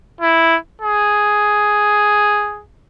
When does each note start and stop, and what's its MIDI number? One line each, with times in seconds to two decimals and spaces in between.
0.21 0.57 64
0.82 2.63 68